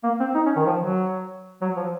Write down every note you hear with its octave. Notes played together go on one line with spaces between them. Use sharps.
A#3
C4
D#4
C#4
D#3
F3
F#3
F#3
F3